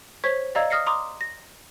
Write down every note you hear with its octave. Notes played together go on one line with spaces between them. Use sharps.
C5 C#5 C#6 G#6 B6
D5 D#5 F5 A#5 E6 G#6
D#6 F6 A#6 C7 C#7
A#5 C6 D6 D#6
A#6